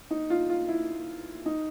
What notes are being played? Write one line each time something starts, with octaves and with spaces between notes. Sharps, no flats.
D#4
F4
F4
E4
D#4